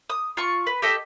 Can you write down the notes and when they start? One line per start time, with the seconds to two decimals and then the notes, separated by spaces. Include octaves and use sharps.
0.10 D#6
0.37 F4 C#6
0.67 B4
0.82 G4 A4 D#5 E6